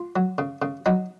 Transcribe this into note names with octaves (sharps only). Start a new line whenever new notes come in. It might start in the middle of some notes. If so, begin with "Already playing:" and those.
Already playing: F4
F#3
C#3
C#3
F#3 D#4